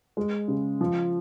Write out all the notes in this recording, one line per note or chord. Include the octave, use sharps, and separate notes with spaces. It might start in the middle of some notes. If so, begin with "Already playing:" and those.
G#3
C#3
F3